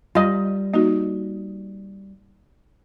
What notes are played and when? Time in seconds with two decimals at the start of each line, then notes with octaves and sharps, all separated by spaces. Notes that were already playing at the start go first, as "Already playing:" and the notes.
0.15 G3 F4 D#5
0.74 A#3 D#4 F#4 D#5